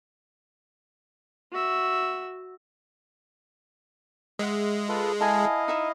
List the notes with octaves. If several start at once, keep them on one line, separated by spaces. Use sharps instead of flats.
F#4 E5
G#3 E5 F#5
F4 A4 B4
E4 A4 D#5 F5 G#5
D#4 E5 D#6